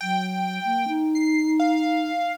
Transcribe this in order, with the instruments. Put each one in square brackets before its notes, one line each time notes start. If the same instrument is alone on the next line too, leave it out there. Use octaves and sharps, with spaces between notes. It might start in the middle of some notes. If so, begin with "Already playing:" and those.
[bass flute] F#3 [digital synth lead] G5
[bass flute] A#3
D#4
[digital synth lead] C7
F5